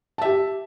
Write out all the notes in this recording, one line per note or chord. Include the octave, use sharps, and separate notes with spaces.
G4 E5 A5